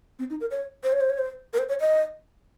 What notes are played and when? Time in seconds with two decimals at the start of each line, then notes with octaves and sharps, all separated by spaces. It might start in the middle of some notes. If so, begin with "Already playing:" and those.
0.19 C4
0.30 D#4
0.41 A#4
0.51 C#5
0.84 C5
0.92 C#5
1.01 C5
1.10 C#5
1.19 C5
1.53 A#4
1.58 C5
1.69 C#5
1.81 D#5